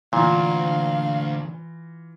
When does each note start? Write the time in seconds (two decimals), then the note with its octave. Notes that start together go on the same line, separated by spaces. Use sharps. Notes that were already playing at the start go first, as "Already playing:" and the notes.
0.13 D2 A#2 E3 F4 F5